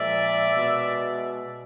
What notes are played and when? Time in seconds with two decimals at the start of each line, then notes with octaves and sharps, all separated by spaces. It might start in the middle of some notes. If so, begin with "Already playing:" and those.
Already playing: A#2 F3 G#3 D5 E5
0.52 B2 G#3